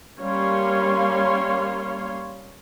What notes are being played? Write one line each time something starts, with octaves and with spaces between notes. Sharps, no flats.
G3 A#3 C#4 C#5 F5 C6